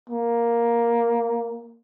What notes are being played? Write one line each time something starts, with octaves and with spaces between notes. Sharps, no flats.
A#3